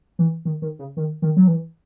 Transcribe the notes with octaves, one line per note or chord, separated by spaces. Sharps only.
E3
D#3
D#3
C#3
D#3
D#3
F#3
E3